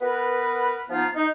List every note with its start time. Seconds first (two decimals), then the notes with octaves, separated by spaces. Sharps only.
0.01 B3 A#4 B4
0.90 F3 B3 D#4 F4
1.15 D#4